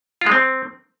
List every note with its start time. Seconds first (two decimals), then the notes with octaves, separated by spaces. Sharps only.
0.21 F4
0.26 G#3
0.32 C4